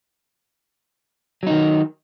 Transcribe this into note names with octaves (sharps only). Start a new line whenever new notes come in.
D#3 F#3 D#4